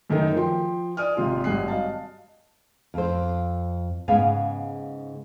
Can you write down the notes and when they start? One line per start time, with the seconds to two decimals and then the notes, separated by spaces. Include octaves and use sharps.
0.10 F#2 D#3 A3 D#4 A#4
0.36 F3 G5 C6
0.97 D5 G#5 D#6 F6
1.17 G#1 C3 F4
1.44 G#1 G2 F#3 G#5 F#6 C7
1.68 D#5 F5 A5
2.94 F2 C5
4.08 G#2 C#3 B3 F5 G#5